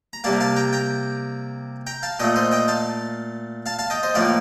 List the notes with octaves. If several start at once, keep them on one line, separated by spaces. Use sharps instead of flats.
A#5
C3 G3 A#3 F5 A5
F5 A5
G5 A#5
G5 A#5
G5 A#5
F5 A5
A#2 A3 D#5 G5
C5 D#5
D#5 G5
F5 A5
F5 A5
F5 A5
D#5 G5
C5 D#5
A2 F3 A#3 D5 F5